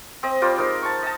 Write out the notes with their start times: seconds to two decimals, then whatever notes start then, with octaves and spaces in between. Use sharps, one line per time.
0.23 C4 D#5
0.42 G3 F4 C5 D6
0.58 G#3 D#4 A#4 D#5
0.82 A5 C#6
1.03 D#5 A5